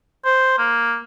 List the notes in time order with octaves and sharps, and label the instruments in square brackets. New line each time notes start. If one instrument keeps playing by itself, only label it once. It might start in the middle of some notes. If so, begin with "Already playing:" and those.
[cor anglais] C5
A#3